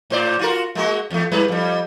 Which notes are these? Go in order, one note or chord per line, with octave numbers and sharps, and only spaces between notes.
A2 C5 D5
F4 F#4 A#4
G#3 A#3 F#4
E2 A3
G#2 G3 B4
F2 G3